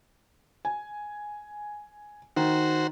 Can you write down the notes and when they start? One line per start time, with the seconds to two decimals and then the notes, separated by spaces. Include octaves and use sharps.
0.65 G#5
2.37 D#3 F#4 C5